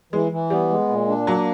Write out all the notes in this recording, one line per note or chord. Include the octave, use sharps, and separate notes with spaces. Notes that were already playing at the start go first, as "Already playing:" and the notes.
E3 G#3
E3
G3 B3
G#3
A#2
D4
F#3 A#3